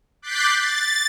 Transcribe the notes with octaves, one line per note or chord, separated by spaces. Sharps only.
D6 F#6 G6 A6 B6 C7
A6